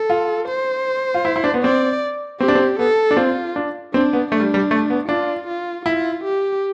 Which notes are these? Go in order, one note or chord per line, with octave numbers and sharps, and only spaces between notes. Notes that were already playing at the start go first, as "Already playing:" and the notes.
Already playing: A4
F4
C5
F4
E4
E4
D4
B3
C4 D5
C4 G4
D4
C4
B3 A4
D4
C4 F4
D4
C4 D4
B3
A3 D4
G3
G3
A3
B3
D4 F4
F4
E4 F4
G4